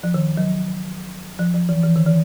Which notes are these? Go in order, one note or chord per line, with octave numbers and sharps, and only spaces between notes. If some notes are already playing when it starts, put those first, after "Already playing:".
F3
D#3
F#3
F3
F3
E3
E3
D#3
E3